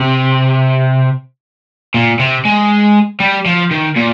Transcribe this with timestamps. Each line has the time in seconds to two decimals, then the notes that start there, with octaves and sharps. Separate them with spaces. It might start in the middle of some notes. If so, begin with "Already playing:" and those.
Already playing: C3
1.94 A#2
2.19 C3
2.45 G#3
3.20 G3
3.45 F3
3.71 D#3
3.96 A#2